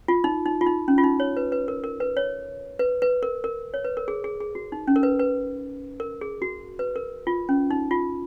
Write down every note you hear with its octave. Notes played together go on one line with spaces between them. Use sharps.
F4
D#4
D#4
F4
D#4
C#4
F4
D#4
C#5
B4
B4
A#4
A#4
B4
C#5
B4
B4
A#4
A#4
C#5
B4
A#4
G#4
G#4
G#4
F#4
D#4
C#4
A#4
B4
B4
A#4
G#4
F#4
B4
A#4
F4
C#4
D#4
F4